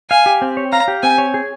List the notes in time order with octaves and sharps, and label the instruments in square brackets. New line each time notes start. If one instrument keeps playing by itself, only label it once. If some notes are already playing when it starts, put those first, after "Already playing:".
[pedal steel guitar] F5 [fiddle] G#5
[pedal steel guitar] G4
C4
C#5
[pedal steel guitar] F5 [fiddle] A#5
[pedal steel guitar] G4
[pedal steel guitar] C4 [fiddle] G#5
[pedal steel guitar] C#5
G#4